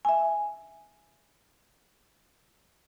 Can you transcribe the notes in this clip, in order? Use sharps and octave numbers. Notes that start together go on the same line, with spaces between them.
E5 G#5